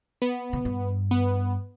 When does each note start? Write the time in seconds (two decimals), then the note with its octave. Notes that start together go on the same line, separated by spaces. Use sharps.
0.22 B3
0.53 C#3
0.65 G2
1.11 B3